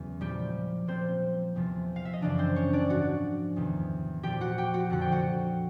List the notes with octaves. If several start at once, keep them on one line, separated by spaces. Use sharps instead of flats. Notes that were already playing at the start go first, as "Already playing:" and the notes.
Already playing: E2 C#3 F#3
A#2 F3 G3 G4
A#2 F3 C4 C5
E2 C3 F3
F5
E5
D#5
F#2 C#3 E3 D4 D5
C4 C5
C#4 C#5
D4 D5
G#2 F3 F#4 F#5
E2 C3 D#3
A#2 F3 G4 G5
F#4 F#5
G4 G5
F#4 F#5
F2 D3 F3 F#5
G5
F#4 F#5